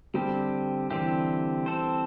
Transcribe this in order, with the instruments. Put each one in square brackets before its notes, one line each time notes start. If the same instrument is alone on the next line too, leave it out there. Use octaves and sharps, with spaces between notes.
[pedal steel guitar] D3 C4 G4 [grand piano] G3
[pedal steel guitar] D3 C4 G4 [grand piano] E3
[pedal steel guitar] C4 A4 C5